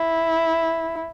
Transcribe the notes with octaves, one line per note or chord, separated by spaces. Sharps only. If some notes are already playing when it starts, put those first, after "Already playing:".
Already playing: E4